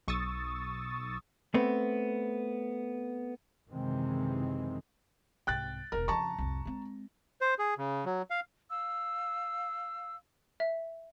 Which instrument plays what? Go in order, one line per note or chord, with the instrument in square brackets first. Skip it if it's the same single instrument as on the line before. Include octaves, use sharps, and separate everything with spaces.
[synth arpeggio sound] B1 C#6 D#6 E6 A6
[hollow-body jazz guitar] A3 B3 C4
[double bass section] F#1 C3 D#3 E3 G#3 C4
[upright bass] C2 G#2 [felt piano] G5 F#6 A6
[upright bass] E1 D#3 [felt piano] A#4
[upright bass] F2 C#3 [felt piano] A5 A#5 C#6
[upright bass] C2 F2
G#3 C4
[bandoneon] C5
G#4
C#3
F#3
F5
[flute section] F5 E6
[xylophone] E5